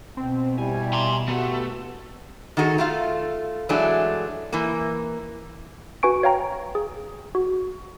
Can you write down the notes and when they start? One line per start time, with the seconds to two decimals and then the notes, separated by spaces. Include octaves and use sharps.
0.17 B2 C4
0.58 G3 E4 G#5
0.93 A#5 C6
1.29 A3 B3 F#4 G4
2.57 D#3 D#4 F#4 G#4 A4
2.78 A3 F4 F5
3.69 E3 F#3 G#3 A3 D4 G#4
4.53 E3 A#3
6.03 F#4 B4 G#5 C#6 D7
6.23 C#5 F5 G5 A#5
6.75 G#4
7.35 F#4